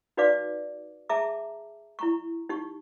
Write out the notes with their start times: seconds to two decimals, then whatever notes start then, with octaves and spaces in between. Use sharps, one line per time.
0.17 D#4 F#4 B4 D5 F5 D6
1.09 G#4 E5 A5 A#5 D6
1.99 E4 A#5 C#6
2.49 D#4 G4 C#6